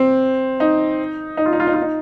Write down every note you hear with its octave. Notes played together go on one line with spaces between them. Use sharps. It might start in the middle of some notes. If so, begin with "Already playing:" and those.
Already playing: C4
D#4
D#4
F4
D#4
F4
D#4
F4
D#4